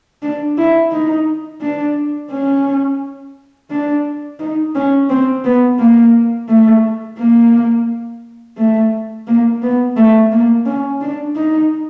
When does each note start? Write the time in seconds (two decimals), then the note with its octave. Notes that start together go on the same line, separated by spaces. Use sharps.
0.23 D4
0.57 E4
0.92 D#4
1.62 D4
2.31 C#4
3.70 D4
4.40 D#4
4.75 C#4
5.09 C4
5.44 B3
5.79 A#3
6.49 A3
7.19 A#3
8.58 A3
9.27 A#3
9.62 B3
9.97 A3
10.32 A#3
10.66 C#4
11.01 D4
11.36 D#4